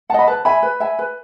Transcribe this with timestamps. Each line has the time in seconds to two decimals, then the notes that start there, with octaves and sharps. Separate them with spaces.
0.10 F#5 A5
0.14 D#5 B5
0.27 B4 A5
0.45 E5 G#5 B5
0.63 B4
0.80 E5 G#5
0.99 B4